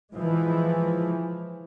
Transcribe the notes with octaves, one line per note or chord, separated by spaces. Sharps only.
E3 F3 G#3